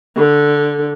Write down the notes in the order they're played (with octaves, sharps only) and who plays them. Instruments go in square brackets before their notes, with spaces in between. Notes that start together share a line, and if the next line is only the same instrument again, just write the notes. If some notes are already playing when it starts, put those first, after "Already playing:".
[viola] D3